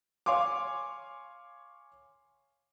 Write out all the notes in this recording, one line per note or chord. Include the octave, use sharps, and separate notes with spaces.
C#5 F5 G#5 C6 D6